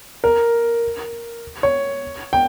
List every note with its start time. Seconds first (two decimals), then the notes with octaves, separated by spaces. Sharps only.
0.24 A#4
1.63 C#5
2.33 G5